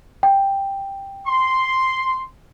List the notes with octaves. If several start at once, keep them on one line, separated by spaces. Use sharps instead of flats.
G5
C6